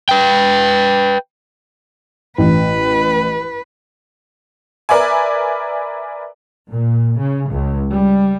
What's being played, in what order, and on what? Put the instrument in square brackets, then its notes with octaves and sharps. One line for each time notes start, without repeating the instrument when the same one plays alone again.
[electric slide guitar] B4 G5
[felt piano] A1 [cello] B4
[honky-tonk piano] A#4 B4 D5 E5 G#5
[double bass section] A#2
C#3
C#2
G3